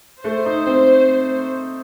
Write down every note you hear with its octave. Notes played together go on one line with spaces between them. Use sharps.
A3 C5
D#4
C4